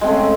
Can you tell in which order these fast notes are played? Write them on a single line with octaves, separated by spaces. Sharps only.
G#3 C4 A3 C#3